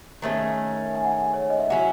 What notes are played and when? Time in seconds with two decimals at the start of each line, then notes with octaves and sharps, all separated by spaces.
0.22 D#3 A3 C#4 G#4
0.95 G#5
1.05 F#5
1.12 G#5
1.34 C#5
1.50 D#5
1.59 E5
1.70 F#3 C#4 E4 F#5